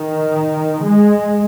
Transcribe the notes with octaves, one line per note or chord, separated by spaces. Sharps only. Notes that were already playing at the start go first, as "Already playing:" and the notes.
Already playing: D#3
G#3